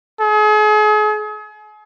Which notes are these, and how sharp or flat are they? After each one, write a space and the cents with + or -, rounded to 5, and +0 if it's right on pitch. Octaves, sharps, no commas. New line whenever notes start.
G#4 +40